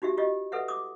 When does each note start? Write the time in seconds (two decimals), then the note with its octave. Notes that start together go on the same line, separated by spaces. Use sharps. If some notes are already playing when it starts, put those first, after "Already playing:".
0.02 D#4 F#4 G4 E5
0.17 F4 G4 D#5
0.52 A4 B4 E5 F#5
0.68 D6 D#6